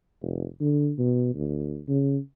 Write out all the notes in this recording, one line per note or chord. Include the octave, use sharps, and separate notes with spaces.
F1
D3
B2
D2
C#3